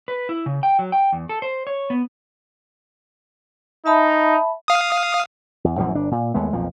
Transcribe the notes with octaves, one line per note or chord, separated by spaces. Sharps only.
B4
E4
C#3
G5
F#3
G5
E2
A4
C5
C#5
B3
D#4 E5 A5 B5
F5 D#6
E2
A#1 F#2 E3 F3
G1 D4
A#2
D#2 G#3 A3 B3
B1 F2 A#2 F3